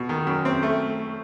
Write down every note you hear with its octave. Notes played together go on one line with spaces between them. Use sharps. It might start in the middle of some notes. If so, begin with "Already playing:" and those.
Already playing: B2
D#3
F#2
C4
A3